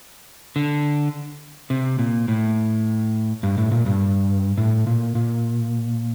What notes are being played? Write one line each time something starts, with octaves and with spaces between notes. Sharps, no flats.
D3
C3
A#2
A2
G2
A2
A#2
G2
A2
A#2
A#2